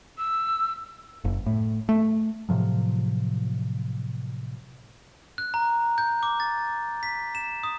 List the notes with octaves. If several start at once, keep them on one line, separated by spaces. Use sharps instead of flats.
E6
F#1
A2
A3
A2 C3 F3 F#3
F#6
A#5
G6
D6
A6
B6
E7
D#6